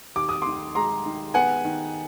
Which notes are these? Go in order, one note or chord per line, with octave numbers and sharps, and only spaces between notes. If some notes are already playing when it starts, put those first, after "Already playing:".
D#2 D6
D#6
D#3 C6 D6
G#3 A#5 C6
D#3
B3 F#5 G#5
D#3